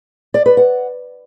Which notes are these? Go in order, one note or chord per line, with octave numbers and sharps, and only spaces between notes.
D5
B4
F#5